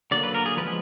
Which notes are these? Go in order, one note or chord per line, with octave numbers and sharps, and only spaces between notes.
D3 F#3 A#3 D5
B4
A#4
G#4
F3 G#3 B3 B4